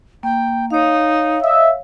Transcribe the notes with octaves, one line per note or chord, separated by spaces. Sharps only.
A#3 G5
D#4 C#5 F5
D#5 E5